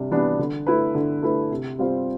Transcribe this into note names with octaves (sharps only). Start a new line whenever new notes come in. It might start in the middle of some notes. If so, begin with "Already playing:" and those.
Already playing: C3 G3 D4
E3 G3 B3 D4
D3
A3 E4 B4
D3
A3 E4 B4
C3
G3 C4 F4 C5